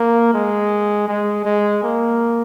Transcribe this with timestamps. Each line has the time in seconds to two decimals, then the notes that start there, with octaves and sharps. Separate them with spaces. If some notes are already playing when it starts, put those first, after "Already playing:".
Already playing: A#3
0.34 G#3
1.08 G#3
1.45 G#3
1.83 A#3